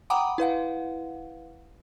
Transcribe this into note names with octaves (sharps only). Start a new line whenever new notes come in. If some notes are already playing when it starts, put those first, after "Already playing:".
F#5 G5 A#5 B5 D6 D#6
E4 B4 F5 F#5